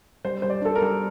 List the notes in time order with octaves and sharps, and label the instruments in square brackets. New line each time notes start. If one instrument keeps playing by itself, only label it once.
[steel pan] G3 [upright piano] C5
[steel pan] G3 [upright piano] C5
[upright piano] D5
[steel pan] D4 [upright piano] A4
[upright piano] A#4
[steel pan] G3